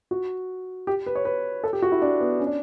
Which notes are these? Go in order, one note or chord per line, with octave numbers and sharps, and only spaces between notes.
F#4
G4
B4
C#5
B4
A4
G4
F#4
E4
D4
B3
C#4
D4